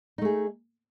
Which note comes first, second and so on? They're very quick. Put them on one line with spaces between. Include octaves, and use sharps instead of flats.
D#4 A3 G#4